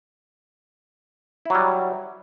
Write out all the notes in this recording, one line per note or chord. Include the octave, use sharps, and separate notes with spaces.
F#3 G3 E4